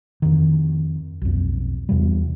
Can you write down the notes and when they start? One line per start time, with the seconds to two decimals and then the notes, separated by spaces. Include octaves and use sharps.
0.22 F2 D#3
1.22 B1 F2
1.89 E2 C3 G3